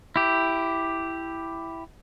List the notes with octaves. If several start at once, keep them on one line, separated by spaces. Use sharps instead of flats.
E4 G4